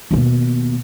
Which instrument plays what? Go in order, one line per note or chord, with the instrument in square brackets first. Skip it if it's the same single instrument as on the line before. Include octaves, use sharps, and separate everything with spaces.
[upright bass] D#2 B2